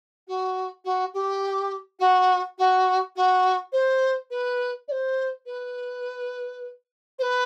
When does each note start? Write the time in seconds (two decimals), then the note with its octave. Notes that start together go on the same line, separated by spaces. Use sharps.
0.27 F#4
0.84 F#4
1.13 G4
1.99 F#4
2.58 F#4
3.16 F#4
3.72 C5
4.30 B4
4.88 D5
4.91 C5
5.46 B4
7.18 C5
7.22 B4